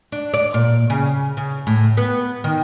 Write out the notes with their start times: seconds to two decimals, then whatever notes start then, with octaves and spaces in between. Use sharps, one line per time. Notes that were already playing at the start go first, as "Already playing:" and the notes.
0.12 D4
0.34 D5
0.54 A#2
0.90 C#3
1.37 C#3
1.67 A2
1.97 B3
2.44 D#3